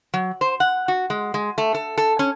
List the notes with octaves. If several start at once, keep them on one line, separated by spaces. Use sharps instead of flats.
F#3
C5
F#5
F#4
G#3
G#3
A3
A4
A4
C#4